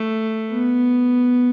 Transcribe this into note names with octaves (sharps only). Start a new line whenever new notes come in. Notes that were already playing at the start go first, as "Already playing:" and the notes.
Already playing: A3
B3